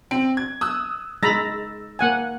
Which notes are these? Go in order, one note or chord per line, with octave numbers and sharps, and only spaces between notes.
C4
G#6
D#6 E6 F#6
G#3 A#5 B5 E6 A6 A#6
A#3 F#5 G#5